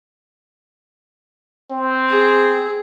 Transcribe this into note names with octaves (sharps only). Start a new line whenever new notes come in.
C4
G#4